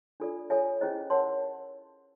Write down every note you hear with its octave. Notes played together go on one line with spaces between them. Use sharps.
D4 F4 A4 D5
F4 A4 C#5 E5 G#5
C#4 E4 G#4 C5 D#5
A#4 C#5 F#5 A5 C6